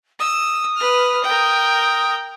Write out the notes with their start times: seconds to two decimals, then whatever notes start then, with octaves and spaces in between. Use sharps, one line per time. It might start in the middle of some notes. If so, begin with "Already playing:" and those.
0.20 D#6 E6
0.77 B4 F6
1.24 A#4 G5